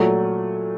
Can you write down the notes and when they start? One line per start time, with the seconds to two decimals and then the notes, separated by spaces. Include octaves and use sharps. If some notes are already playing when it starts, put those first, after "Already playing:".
Already playing: A#2 F#3 A3